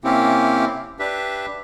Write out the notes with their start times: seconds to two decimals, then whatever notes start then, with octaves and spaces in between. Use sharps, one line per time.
0.04 C3 A#3 C4 C#4 E4 G4
0.99 D4 G4 B4 E5